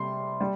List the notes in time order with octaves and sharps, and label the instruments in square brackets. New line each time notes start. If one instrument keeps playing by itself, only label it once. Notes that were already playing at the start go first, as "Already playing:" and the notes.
Already playing: [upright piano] C3 G3 C6
G3